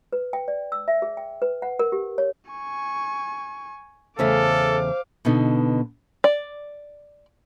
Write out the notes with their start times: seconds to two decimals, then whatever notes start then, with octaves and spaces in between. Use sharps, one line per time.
0.13 B4
0.33 G5
0.48 D5
0.72 E6
0.88 E5
1.02 G#4
1.17 G5
1.42 B4
1.62 F#5
1.79 A#4
1.92 G4
2.18 C#5
2.51 G#5 C#6
4.19 E2 C#3 A3 A4 C5 F5 D6
5.25 B2 D3 B3 D#4
6.24 D5